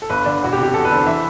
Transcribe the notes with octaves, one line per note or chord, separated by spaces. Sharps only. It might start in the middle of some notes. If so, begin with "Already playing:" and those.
A4
G1 B4
D3 D5
E1 F#4
G4
C3
G4
E2 A4
B4
D3 C5
E3 E5